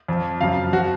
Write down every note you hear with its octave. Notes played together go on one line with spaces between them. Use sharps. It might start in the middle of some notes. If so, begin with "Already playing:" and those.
F2 F3
F#2 C#3 F3 F5
F3 F#4